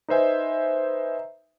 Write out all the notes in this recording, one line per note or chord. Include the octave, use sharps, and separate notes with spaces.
D#4 B4 C5 E5 G#5